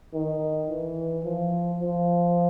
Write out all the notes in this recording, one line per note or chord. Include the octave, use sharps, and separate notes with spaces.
D#3
E3
F3
F3